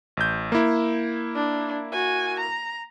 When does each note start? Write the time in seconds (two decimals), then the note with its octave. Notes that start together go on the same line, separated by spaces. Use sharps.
0.17 A1 G6
0.52 A#3 E4
1.36 D4
1.93 F#4 G#5
2.40 A#5